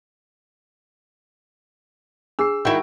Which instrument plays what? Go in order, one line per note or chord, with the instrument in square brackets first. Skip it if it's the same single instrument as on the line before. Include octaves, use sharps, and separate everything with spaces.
[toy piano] D4 G#4 [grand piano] E6 C7
[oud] D#3 E4 [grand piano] F#4 G5 C#6